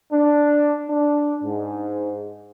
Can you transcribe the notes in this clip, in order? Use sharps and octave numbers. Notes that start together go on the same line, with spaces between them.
D4
D4
G#2